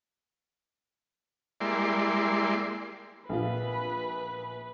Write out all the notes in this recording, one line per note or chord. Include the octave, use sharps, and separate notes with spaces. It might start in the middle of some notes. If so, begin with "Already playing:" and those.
G3 G#3 A#3 E4 D5 C6
A#1 F4 B4